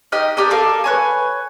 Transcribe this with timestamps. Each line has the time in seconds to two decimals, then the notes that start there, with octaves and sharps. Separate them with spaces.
0.12 D#4 G4 D#5 F6
0.37 D4 G4 A#4 D#5
0.50 A4 A#4 F5
0.84 B4 C#5 G#5